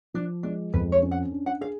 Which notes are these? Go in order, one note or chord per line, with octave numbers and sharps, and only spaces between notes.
F3 D4
G#3 D4
F2 B4
C#5
C#4
F#5
D4
F#5
G#4 F5